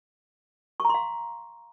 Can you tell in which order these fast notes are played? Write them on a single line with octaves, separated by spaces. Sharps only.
C#6 A#5 C6 F5